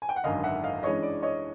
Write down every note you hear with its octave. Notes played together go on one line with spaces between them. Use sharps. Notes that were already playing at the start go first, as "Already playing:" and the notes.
G#5
G5
F#5
G#1 F#2 D3 D#5 F5
E5 F#5
D#5 F5
G2 E3 G#3 C#4 C#5 D#5
D5
C#5 D#5